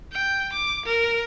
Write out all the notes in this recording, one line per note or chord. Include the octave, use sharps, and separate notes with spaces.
G5
D6
A#4